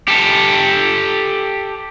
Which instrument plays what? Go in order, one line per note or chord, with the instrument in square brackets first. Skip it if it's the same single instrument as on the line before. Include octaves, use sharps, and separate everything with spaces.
[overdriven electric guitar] G4 A4